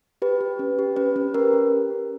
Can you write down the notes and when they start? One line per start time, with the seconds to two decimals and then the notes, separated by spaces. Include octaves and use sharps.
0.22 G4 B4
0.41 G4
0.59 C#4
0.79 G4
0.96 C#4 B4
1.16 C#4
1.34 G4 A#4
1.53 C#4